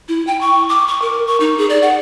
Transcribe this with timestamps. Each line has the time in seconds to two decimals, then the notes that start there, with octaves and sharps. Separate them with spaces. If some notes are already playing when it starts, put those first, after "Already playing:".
0.09 E4
0.27 G5
0.41 C#6
0.69 D6
0.88 C#6
1.02 A#4
1.27 C#6
1.40 D#4
1.58 G#4
1.70 D5
1.83 F#5